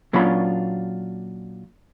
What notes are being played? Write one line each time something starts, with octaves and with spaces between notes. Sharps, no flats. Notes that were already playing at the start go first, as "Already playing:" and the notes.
A#2 F#3 C#4 D4 F4 B5